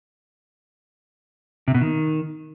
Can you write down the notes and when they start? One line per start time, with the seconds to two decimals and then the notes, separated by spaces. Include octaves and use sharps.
1.68 C3
1.74 B2
1.81 D#3